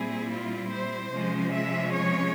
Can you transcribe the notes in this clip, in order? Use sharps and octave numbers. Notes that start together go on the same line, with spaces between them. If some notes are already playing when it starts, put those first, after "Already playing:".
Already playing: A#2 G3 C4 E4 G#4
F4
C5
C3 F3 G#3 C#4
E5
C#5